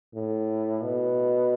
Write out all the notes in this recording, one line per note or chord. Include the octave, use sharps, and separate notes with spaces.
A2
B2